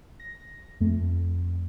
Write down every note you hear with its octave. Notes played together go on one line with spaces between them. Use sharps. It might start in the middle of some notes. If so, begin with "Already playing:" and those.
A#6
F2 A3